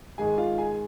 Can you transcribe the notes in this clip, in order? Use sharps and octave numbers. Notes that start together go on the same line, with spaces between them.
G#2 D#3 G#3 G#4 G#5
F4 F5
G#4 G#5